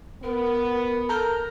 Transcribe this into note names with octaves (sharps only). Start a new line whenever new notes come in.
B3 A#4
A4 A#4 A#5 F6 G6